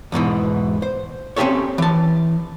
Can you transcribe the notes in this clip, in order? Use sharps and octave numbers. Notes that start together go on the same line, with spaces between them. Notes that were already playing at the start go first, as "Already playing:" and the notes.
E2 G#2 B2 E3
C5
C4 C#4 E4 G4 A4 C#5
E3 A5